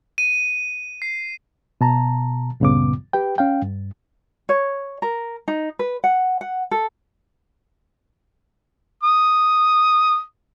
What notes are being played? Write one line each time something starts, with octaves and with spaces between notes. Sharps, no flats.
D#7
C7
B2 A5 A#5
C#2 G2 A#2 C#3 B3 D6
G4 B4 G5
C#4 F5 G5
G2
C#5
A#4
D#4
B4
F#5
F#5
A4
D#6